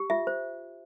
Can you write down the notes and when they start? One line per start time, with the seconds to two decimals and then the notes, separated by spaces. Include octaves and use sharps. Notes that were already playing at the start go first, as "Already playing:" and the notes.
Already playing: G4
0.10 F4 E5
0.27 C5